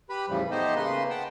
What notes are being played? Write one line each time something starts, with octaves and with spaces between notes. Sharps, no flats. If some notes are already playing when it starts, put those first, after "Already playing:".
G4 B4 B5
E2 A2 C#3 E3 F3 G3
A3 B3 D#4 G4 C5 D#5
C#3 A#3 B4 C6
F#5 G5 A5